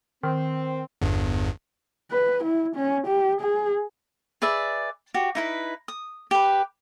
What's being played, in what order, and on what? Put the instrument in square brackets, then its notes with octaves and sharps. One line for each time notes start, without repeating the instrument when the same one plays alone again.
[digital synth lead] D#3 [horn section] C4
[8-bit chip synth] G1 E2 G2
[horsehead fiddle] B4
E4
C#4
G4
G#4
[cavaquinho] G#4 B4 D5 E5
F#4 G4
D#4 E4 B4
D#6
G4 B4